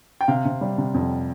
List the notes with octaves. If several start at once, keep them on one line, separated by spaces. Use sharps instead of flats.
G5
C3 F5
C3
G3
C3
F2